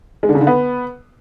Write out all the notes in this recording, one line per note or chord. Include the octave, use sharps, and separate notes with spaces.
G#3
D3
C#3
D3
B3